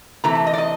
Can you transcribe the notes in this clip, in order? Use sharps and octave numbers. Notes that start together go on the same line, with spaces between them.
C3 E3 A3 A#5
A5
D#5
D5
D#5